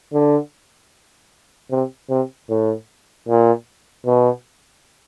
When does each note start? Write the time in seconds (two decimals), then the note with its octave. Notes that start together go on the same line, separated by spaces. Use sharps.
0.13 D3
1.71 C3
2.09 C3
2.49 A2
3.28 A#2
4.06 B2